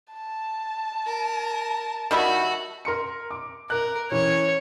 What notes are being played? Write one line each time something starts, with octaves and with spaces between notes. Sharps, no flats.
A5
A#4
D#3 G3 E4 F#4
A#4 C6 C#7
D6
A#4 F#6
E3 C#4 C#5